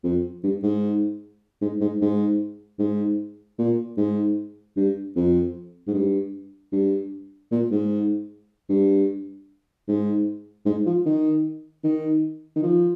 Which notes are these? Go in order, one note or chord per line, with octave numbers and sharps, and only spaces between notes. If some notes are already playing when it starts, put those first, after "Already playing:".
F2
G2
G#2
G#2
G#2
G#2
G#2
A#2
G#2
G2
F2
G#2
G2
G2
A#2
G#2
G2
G#2
G#2
F3
D#3
D#3
D#3
F3